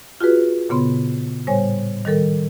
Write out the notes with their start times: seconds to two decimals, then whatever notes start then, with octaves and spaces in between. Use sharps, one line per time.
0.21 F4 F#4 G#4 B4
0.70 A#2 C#3 B3 C6
1.47 A2 G3 C5 C#5 G#5
2.05 D#3 G3 A4 A#4